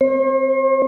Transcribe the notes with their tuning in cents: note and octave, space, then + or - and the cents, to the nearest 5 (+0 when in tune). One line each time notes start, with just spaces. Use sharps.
C4 +0 C5 +45